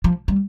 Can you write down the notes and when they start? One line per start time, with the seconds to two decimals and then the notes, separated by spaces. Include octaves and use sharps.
0.04 F3
0.28 G3